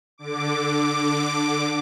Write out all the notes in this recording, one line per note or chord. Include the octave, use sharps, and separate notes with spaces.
D3 D6